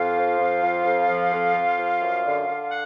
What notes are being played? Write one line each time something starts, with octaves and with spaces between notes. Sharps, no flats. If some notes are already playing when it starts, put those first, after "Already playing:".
Already playing: F2 F4 F5
F3
F2
F3
F2
F3
F2
F2
F3
F#2
D3
D3
F#5